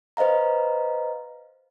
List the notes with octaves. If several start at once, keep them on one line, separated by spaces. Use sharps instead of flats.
B4 C5 D#5 F5 A#5